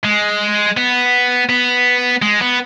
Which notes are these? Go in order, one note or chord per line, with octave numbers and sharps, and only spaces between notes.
G#3
B3
B3
G#3
B3